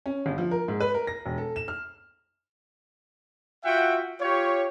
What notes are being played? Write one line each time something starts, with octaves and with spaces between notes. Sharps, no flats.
C#4
G1
F3
A#4
G#2
B4
A#4
A#6
E1
A4
E7
F6
F4 F#4 E5 F#5 G5
F4 G4 C#5